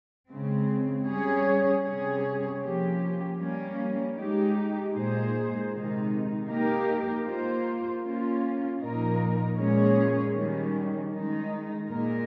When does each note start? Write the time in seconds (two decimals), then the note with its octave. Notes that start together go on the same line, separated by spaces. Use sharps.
0.29 C#3 G#3 C4
1.06 G3 C#4 G#4 C#5
1.83 C3 G3 C#4 G#4 C#5
2.60 F3 A#3 C#4 G4
3.38 G3 A#3 C#4
4.15 G#3 D#4 G4
4.93 A#2 G#3 D#4 G#4 C5
5.70 C3 D#3 G#3 D#4
6.47 A#3 D#4 G4 A#4
7.24 A#3 F4 C5
8.02 A#3 C#4 F4
8.79 A#2 F3 A#3 D#4 A#4
9.56 A#2 G#3 C#4 G#4 C#5
10.33 D#3 G3 C#4
11.11 D#3 G#3 D#4
11.88 A#2 G#3 D#4 A#4